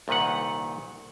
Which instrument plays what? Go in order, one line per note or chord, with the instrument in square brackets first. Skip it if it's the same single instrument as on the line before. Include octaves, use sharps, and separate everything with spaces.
[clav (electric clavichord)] C2 A#2 D#3 B4 F#5